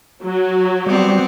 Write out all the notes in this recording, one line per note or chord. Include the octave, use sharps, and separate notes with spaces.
F#3
G3 B3 C4